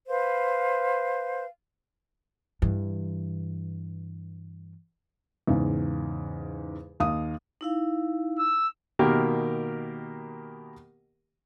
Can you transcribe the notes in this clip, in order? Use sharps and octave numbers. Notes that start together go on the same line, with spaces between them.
B4 C5 F5
G2 E3
E2 G#2 C#3
D#2 D#4 F5 D#6
D#4 E4 F5
E6
B2 D#3 A#3 G4 A#4